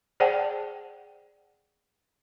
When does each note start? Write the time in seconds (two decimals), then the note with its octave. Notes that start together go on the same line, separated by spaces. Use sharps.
0.20 G#4 C5 D5 F#5 G5 A5